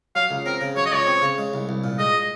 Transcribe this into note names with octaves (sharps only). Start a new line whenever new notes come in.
F#3 F5
C#2
C4 A#4
C#3
F#3 C#5
D#5
C#2 C#5
C4
C#3
G#3
C2
C2
A#2
G#3 D#5